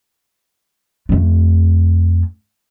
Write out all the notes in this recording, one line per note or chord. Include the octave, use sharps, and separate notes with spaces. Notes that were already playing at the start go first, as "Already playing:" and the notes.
F2 A3